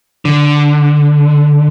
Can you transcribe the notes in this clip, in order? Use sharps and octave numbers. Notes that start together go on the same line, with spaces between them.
D3